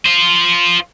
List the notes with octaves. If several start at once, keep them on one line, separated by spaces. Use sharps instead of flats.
F4 C5